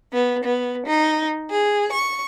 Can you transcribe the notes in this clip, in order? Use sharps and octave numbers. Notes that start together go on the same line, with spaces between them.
B3
B3
D#4
G#4
C#6